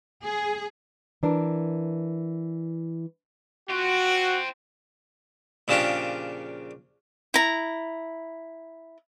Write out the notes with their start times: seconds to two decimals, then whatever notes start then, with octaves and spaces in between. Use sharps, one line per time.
0.24 G#4
1.23 E3 D4 A#4
3.69 C4 F4 F#4
5.68 A#2 C#3 F3 D4 G4
7.34 E4 A#5